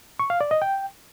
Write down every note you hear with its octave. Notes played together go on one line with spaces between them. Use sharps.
C#6
F5
D5
D#5
G5